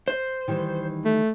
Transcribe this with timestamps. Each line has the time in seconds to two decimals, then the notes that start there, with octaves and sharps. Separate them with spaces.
0.08 C5
0.48 D#3 E3 G3
1.05 A3